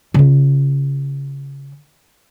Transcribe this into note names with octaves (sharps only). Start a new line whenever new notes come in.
C#3 F4